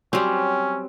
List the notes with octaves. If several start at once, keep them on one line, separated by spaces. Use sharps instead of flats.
F#3 G3 C4 C#4